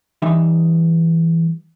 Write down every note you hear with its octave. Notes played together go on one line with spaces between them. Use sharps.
E3 G3 D#4 E5